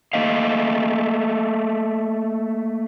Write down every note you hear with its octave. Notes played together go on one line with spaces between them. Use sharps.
A3 A#3 D#5 F5